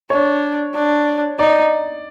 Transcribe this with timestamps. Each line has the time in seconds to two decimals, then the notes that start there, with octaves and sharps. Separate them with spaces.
0.10 D4 C#5
0.74 D4
1.39 D#4 D5